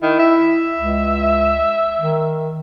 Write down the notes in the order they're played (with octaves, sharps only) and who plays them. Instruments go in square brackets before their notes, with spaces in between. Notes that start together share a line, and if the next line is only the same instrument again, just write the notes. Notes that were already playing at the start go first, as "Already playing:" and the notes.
[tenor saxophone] D#3 [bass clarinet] E4
[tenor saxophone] E5
[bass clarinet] C#2
D#3